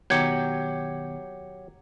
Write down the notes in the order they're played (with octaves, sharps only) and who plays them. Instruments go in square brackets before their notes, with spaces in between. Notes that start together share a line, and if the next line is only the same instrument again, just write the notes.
[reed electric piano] B2 D#3 B3 [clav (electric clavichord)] F#3 G4 [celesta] G6 G#6 C#7